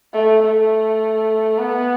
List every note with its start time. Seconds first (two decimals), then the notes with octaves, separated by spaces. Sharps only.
0.13 A3
0.43 A3
1.58 B3